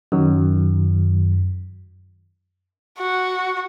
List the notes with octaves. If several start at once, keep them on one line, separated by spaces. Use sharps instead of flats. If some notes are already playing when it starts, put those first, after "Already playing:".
F#2 D#3 F#3
F#4